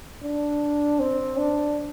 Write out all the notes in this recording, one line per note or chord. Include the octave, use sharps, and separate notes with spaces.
D4
C4
D4